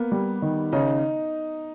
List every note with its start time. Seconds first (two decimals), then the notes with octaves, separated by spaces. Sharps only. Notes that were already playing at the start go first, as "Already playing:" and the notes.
Already playing: A#3 B3
0.12 G3
0.42 D#3
0.73 C#3 D#4